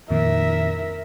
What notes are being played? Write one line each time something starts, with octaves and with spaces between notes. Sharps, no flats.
F2 A#2 D#3 A#4 E5